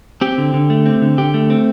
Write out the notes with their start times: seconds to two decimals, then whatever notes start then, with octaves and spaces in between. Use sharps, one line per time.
0.21 C4 G4
0.38 D3
0.54 D3
0.70 A3
0.86 C4
1.02 D3
1.18 D3 G4
1.34 A3
1.50 C4